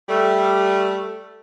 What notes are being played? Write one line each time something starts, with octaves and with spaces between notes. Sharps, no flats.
G3 A3